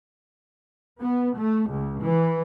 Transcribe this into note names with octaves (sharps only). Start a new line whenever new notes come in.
B3
A3
C#2
E3